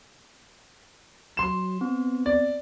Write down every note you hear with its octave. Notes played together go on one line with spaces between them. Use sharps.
F#3 C6 E7
B3 C4
D5